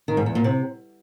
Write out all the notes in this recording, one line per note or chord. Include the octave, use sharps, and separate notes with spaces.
D#3
G#2
E2
A#2
C3